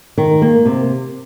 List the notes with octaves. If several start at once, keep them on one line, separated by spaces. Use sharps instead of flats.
D#3
A#3
C3